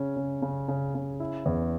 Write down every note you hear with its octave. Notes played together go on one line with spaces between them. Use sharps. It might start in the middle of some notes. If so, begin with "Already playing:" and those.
Already playing: C#3 C#4
C#3
C#3
C#3
C#3
E4
E2